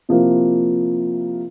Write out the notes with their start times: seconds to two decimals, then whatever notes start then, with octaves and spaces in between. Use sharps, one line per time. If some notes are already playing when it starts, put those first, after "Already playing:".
0.09 C3 F3 A#3 E4